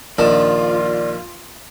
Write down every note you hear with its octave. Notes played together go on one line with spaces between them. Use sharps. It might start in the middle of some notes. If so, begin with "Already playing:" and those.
A#1 D#3 D4 F4 D5 E7